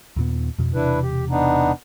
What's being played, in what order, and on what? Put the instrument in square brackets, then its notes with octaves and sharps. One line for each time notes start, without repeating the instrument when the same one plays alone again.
[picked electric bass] D#2 A#2 B3
F2 B2
[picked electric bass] E1 C3 [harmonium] D4 E4 B4
[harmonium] G4
B3 D4 D#4